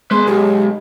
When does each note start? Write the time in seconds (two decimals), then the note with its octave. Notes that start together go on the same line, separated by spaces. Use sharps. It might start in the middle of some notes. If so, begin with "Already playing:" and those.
0.11 G#3 B3 B4 C6
0.27 B1 G4